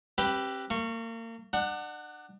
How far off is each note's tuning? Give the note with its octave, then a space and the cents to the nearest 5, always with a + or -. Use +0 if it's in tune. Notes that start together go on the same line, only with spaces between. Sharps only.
C4 +40 G4 -5 B4 +0
A#3 -35 C#6 +0
D4 +35 F#5 +0